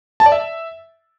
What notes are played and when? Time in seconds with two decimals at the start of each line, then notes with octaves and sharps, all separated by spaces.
0.20 A5
0.26 D5
0.32 E5